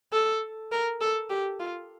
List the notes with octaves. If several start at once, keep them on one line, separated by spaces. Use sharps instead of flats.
A4
A#4
A4
G4
F4